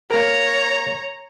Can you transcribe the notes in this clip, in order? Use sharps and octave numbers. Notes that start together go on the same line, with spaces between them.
A#3 A#4 C#5 A#5